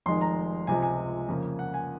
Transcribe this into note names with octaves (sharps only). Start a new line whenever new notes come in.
F1 F2 D#3 G#3 C6
A#5
C#2 C3 F3 G#3 G#5
G#5
F2 C#3 F3 A#3
F#5
G#5